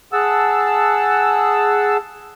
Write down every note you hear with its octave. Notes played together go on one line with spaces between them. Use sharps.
G#4 F#5 A5 E6